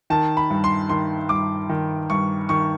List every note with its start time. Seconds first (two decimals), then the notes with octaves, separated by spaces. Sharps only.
0.10 D#3 A5
0.37 B5
0.50 G2
0.64 C6
0.89 D#3 C6
1.29 G2 D6
1.69 D#3
2.10 G2 C#6
2.49 D#3 C#6